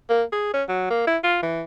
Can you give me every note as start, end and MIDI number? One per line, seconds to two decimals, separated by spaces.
0.09 0.23 58
0.32 0.52 68
0.53 0.63 61
0.69 0.87 54
0.90 1.06 58
1.07 1.18 64
1.23 1.39 65
1.42 1.63 52